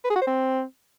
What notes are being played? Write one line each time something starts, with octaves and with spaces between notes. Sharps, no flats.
B4
G#4
F#4
C5
C4